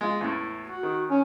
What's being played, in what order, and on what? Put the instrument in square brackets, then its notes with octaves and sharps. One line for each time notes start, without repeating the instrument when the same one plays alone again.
[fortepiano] G#3 F4
E2 A2
[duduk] F#4
[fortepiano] D#3
[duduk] C#4